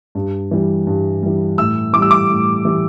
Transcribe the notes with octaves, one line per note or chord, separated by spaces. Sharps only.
G2
E3 G3
G2
E3 G3
A2 E6
E3 G3 D6 E6
D6
A2
E3 G3